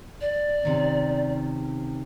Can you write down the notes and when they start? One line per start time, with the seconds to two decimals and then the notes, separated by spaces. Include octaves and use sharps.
0.21 D5
0.63 C3 D#3 C#4